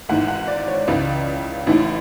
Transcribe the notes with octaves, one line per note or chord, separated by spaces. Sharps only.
G#1 G#2 E3 G#3 F#5
F#5
D5
C#5
C#2 C#3 E3 D5
A1 A2 E3